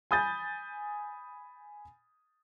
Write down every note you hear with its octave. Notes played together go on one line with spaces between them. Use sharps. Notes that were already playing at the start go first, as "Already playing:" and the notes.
G#5 B5 D#6 G6 A6